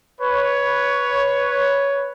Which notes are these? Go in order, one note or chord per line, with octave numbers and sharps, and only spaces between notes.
B4 C#5